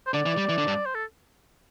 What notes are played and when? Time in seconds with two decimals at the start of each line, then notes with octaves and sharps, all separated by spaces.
0.07 C5
0.13 D3 D5
0.26 E3
0.37 G3
0.49 E3
0.58 D3
0.67 G2
0.86 C5
0.94 A4